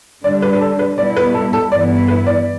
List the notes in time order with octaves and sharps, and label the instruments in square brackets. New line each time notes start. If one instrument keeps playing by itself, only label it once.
[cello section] D3 G3 D4 [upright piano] D5
[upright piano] B4
B4
A4
B4
[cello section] B2 G3 B3 E4 [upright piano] D5
[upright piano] B4
A4
A4
[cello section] G2 E3 B3 E4 [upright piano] D5
[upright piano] B4
D5